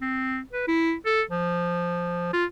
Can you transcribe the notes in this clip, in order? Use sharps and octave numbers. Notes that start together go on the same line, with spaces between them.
C4
B4
E4
A4
F3
F4